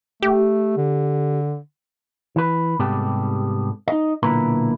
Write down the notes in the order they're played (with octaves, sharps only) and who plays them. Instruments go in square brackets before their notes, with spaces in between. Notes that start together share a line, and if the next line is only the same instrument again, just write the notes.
[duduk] A3 [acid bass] G4
[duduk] D3
[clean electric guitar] E3 B4
G#2 C3 G3 B3 G4 A4
D#4 D#5
B1 A#2 D3 E4 B4 A#5